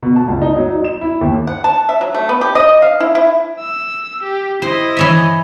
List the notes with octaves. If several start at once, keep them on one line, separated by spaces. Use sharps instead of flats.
B2
A5
C#2
D#4
F#3
D#4
E7
E4
D#2
F#5
A5
E5
F#3
A3
B3
G4
D#5
F5
E4
E4
E6
G4
E4 C5 D#5
E3 C#5 E5